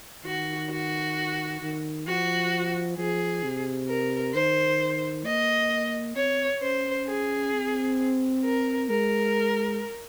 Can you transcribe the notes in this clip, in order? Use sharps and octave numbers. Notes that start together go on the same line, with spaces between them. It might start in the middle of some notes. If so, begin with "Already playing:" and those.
D#3 F#4
F#4
D#3
F3 F#4
F3 G#4
C3
A#4
D#3 C5
A#3 D#5
C4 C#5
C#4 C5
G#4
C4
A#4
G#3 A#4